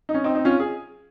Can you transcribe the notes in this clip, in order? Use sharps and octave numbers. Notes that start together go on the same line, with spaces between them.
D#4
C#4
C4 D#4
C4 D#4
C#4 F4
G#4